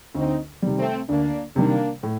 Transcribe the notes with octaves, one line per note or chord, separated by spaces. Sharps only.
D2 C4 D#4
C3 D#3 G3
A3 C4
D2 A#3 D4
C3 D#3 G3 A#3 D4
A2